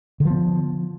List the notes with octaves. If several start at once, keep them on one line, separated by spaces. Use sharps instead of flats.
D3 F3 B3